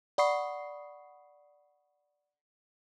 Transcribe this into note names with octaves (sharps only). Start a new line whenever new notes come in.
D5 F#5 B5 C#6 D#6 C7